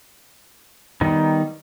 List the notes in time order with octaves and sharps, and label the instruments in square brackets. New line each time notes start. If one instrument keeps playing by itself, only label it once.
[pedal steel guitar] D#3 G3 B3 D#4